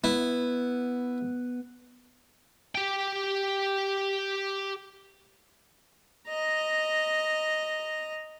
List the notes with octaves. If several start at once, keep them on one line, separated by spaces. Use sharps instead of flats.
B3 E4
G4 G5
D#5 A#5